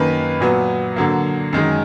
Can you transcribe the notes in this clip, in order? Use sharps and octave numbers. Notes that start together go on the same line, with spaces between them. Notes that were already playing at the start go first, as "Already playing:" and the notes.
Already playing: F#2 D#3 A#3 B4
A#2 F#3 B3
D3 F#3 A#3
F#2 D#3 G#3